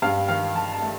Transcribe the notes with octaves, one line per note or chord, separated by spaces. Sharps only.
G2 F5
D#3 F5
D#3 A5
A5
A3